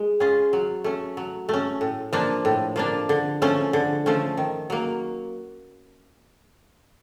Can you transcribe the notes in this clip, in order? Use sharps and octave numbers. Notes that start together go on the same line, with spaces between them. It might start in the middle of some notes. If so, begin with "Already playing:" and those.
Already playing: G#3
C#4 F4 G#4
F#3
A3 C#4
F#3
A3 C#4
A2
F3 A#3 D4
A2
F3 A#3 D4
D3
F3 A3 C#4
D3
F3 A3 C#4
D#3
F#3 A#3